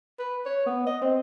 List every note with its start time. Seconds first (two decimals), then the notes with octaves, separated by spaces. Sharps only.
0.19 B4
0.46 C#5
0.66 B3
0.86 D#5
1.02 C4